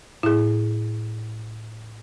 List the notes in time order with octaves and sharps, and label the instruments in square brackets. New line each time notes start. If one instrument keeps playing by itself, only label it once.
[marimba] A2 [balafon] E4 G#4